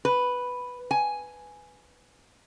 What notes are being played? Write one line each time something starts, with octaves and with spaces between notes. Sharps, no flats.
B4
G#5